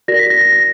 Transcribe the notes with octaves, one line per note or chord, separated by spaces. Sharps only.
F#4 A#4 D5 A#6
B6
A#6
A#6
A#6